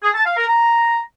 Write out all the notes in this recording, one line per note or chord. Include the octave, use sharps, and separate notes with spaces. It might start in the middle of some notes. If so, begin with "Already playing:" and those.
G#4
A5
F5
A#4
A#5